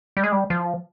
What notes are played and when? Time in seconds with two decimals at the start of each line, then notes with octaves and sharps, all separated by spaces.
0.17 G3
0.24 G#3
0.32 G3
0.50 F3